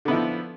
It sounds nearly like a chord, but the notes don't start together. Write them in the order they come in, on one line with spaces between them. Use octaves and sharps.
D3 B3 E4 F3